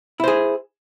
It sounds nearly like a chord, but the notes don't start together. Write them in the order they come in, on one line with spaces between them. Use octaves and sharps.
E4 C5 G#4